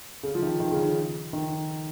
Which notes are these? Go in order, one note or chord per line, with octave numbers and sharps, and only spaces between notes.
C#3
F3
D#3
D#3
C#3
D#3
D#3